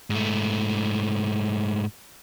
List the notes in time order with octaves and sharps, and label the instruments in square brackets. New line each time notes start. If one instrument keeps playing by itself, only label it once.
[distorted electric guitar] G#2 A3